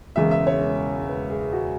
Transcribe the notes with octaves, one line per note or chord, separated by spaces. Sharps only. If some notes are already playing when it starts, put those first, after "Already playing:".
E1 E2 C#3 G#3 E5
E5
C#5
B4
G#4
F#4